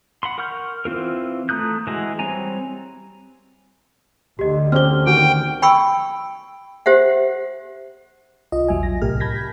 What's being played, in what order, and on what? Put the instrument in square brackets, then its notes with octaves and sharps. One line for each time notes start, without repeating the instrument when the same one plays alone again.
[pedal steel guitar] F#5 B5 C6
A#4 F#5 C#6 F6 G6
E3 C4 F4 A#4
A3 A#5 D#6 F#6 G6
E3 G#3 F#4
G3 C4 C#5 G#5 A#5
[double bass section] D2 D3 [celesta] G4 D#5
[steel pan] C4 C#4 G4 [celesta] F6 G7
[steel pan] D#3 F#4 [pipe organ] G5
[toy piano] G5 B5 C#6 E6
G4 C5 E5 F#5
[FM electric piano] C2 F4 D#5
A#1 E2 F#3 E5 G#5
A#6
C2 A2 C3 G4 A#4 F6
A5 B5 G6 G#6 A#6 B6